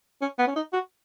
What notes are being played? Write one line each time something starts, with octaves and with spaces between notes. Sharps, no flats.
C#4
B3
C#4
D#4
F#4